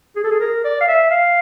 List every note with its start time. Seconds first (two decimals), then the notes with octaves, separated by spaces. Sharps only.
0.16 G#4
0.24 A4
0.31 G#4
0.41 A#4
0.65 D5
0.81 F5
0.88 E5
1.11 F5